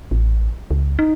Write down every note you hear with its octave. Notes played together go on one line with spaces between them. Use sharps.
A1
C#2
D#4